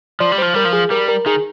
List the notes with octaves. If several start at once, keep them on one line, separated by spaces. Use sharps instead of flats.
F3 D5
G3
F3 C5
G3 A#4
F3
G#4
G3 A#4
A#4
D#3 G#4